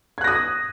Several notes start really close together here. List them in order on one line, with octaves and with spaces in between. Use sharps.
G#6 F#6 A#6 D#6